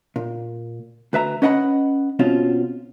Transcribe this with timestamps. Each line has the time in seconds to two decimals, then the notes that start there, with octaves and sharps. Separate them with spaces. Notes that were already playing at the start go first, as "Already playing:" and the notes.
0.16 A#2
1.13 D2 B4 E5 A#5
1.42 C#4 B4 D#5 F#5 G5 B5
2.19 B2 C4 C#4 F4